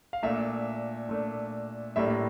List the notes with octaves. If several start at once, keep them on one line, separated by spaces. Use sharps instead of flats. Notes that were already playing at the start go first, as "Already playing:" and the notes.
F5
A#2 A3 D4 E5
A#2 A3 D4
A2 G3 A#3 D4 E5